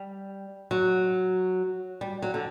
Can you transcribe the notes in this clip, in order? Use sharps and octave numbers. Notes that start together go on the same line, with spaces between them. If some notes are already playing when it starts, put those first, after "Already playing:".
Already playing: G3
F#3
G3
F#3
D3